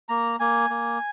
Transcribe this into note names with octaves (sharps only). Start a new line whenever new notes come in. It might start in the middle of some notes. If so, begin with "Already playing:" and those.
A#3 A#5
A#3 G#5
A#3